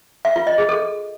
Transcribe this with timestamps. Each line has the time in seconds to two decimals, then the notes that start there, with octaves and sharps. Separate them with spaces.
0.25 E5
0.36 F4
0.47 D#5
0.58 G#4
0.69 A4